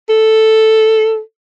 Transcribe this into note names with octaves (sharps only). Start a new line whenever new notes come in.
A4